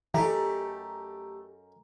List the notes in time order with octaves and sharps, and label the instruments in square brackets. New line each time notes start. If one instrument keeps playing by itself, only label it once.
[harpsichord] F#2 A4 D#5 [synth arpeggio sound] E3 [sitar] A3 G4 [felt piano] A#5